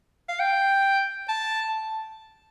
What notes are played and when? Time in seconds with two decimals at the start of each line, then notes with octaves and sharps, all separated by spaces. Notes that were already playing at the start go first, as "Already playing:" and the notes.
0.29 F5
0.40 G5
1.29 A5